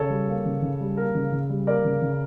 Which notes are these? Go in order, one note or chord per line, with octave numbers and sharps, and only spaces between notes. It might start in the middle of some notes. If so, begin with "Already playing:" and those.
Already playing: C#3 A4 C#5
G3
A#3
C#3
C#3
G3
A#3 A#4
C#3
C#3
G3
A#3 A#4 D5
C#3
C#3